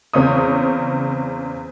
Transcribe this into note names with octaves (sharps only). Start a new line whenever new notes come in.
E2 C#3 C4 C#5 D#6